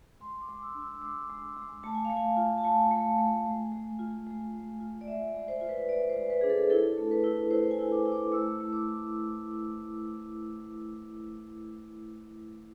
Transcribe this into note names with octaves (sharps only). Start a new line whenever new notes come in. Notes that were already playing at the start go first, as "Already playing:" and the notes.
G#3 C6
D6
G#3
E6
D4
E6
G#3 D6
G#3
G#3
A3 A5
G#5
F5
A3
G#5
F4
A5
A3 G#5
A3
A3
G#3
G#3
F4
G#3
G#3
F4
D5
G#3 E5
D5
G#3
C5
F4
B4
G#3 D5
C5
G#3
B4
D4 G#4
A4
E4 A4
A3
B4
E4
E4 C5
G#5
E4
D6
E4
D6
A3 E6
A3
D6